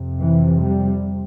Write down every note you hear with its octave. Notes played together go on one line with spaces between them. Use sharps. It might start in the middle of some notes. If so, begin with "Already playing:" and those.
Already playing: F2 C3
E3
G3